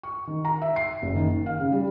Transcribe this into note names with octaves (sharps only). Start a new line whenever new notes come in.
C#6
D#3
A#5
E5
C7
F#1
D#3
D#3
F5
C#3
G3